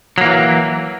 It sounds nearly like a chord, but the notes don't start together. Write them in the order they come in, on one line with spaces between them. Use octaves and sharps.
F#3 A#3 E3